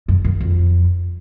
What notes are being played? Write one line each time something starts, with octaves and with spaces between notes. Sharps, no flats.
F#2
F#2
F2